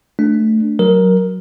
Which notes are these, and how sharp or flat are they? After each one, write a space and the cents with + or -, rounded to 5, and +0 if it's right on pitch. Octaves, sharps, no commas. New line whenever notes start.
A3 +0 D4 +0
F#3 +0 A#4 +10